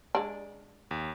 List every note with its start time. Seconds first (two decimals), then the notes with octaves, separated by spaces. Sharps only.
0.15 G#3 D4
0.91 D#2